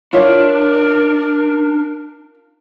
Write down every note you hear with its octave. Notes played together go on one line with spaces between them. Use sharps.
D4 F4 A#4 C#5 E5